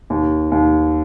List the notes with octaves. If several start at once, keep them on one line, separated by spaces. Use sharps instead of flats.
D#2
D#2